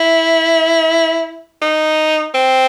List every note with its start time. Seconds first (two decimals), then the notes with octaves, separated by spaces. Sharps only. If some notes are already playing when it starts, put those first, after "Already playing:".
Already playing: E4
1.62 D#4
2.34 C4